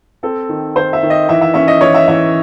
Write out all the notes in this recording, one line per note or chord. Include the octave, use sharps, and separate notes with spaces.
C4 A4
D#3
D#3 C5
E5
D#3
D#5
E3 E5
E5
C#4 E5
D#5
E3 C#5
E5
E3 E5